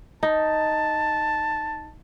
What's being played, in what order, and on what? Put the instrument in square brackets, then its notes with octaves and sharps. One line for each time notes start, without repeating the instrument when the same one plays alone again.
[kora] D#4 [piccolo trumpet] A5